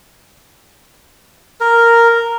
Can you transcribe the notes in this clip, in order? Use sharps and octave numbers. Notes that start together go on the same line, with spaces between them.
A#4